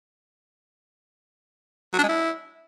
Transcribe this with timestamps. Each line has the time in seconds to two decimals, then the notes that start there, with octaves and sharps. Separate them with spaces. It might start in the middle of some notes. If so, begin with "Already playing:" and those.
1.93 F#3
1.99 D4
2.04 G#3
2.09 E4